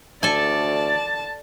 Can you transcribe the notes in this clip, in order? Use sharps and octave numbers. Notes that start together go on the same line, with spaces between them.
D2 A4 D5 G#5 A5